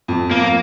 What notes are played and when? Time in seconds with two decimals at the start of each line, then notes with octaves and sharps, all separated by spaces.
0.08 F2
0.31 F2 A#3